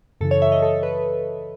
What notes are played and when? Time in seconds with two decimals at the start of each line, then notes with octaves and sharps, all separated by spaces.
0.21 F#2 C#3 E3 A4
0.31 C#5
0.42 E5
0.52 D#5
0.62 A4
0.83 B4